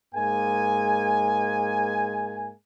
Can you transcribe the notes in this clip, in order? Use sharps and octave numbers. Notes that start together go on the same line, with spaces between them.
G#2 G#3 A#3 G#5